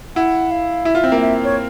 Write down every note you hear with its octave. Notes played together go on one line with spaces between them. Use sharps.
E4 F#5
F5
E4 E5
F4
C4
A#3
E5
C#5